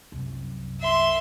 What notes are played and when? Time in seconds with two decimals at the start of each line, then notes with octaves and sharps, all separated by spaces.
0.12 C2 F#2
0.80 E5 C6